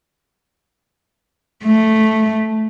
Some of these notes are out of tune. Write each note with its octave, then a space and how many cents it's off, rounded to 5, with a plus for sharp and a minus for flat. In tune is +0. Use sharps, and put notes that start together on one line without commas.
A3 -5